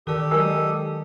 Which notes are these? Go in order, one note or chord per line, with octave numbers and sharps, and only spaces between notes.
D#3 G4 A4 A#4 D5 D#6
F#3 G#3 A#4 D5 G#5 E6